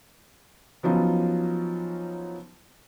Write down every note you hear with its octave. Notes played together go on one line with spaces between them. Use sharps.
F3 F#3 B3 C#4 D#4 F4